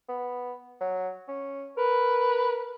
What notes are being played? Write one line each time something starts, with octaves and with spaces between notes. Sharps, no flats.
B3
F#3
C#4
A#4 B4